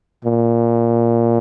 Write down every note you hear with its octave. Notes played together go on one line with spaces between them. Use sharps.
A#2